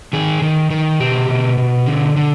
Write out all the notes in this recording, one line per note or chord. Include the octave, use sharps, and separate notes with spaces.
D#3 G#4
D#3
D#3
B2 G4
B2
B2
D3
D3